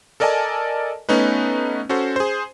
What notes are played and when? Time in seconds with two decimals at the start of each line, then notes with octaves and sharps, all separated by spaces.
0.20 A4 A#4 D5 D#5 G#5 A5
1.09 A3 B3 C#4 D#4 B4
1.89 C#4 F#4 A4 C5
2.16 G#4 C5